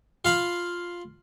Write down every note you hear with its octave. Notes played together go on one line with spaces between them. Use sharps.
F4 F5 B5